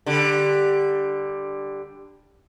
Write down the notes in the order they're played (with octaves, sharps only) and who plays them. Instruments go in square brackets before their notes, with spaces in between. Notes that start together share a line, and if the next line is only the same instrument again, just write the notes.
[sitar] D3 G3